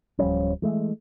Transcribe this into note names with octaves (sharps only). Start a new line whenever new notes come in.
D1 F3 G3 C#4
E3 G#3 A3